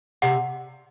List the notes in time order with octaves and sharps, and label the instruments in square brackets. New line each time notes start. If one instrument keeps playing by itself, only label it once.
[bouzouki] C3 [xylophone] F#5